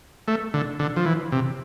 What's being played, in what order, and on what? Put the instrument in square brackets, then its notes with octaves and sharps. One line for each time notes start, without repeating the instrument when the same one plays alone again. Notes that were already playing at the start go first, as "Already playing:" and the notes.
[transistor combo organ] A3
D3
D3
F3
E3
C3